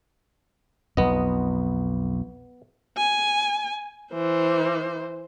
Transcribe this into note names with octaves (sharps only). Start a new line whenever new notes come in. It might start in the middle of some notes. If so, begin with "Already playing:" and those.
B1 F2 B3 D#5
G#5
E3 C5